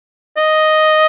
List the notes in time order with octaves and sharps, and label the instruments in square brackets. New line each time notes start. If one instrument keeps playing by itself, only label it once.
[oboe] D#5